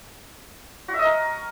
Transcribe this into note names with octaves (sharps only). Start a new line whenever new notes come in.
F#4
E5
D#5
A#4